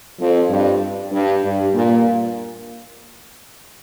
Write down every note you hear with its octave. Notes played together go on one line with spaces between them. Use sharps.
F2
G2
G2
G2
A#2